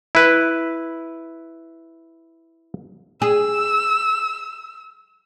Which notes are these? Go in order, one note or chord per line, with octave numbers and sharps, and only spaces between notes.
E4 B4
G#4 E6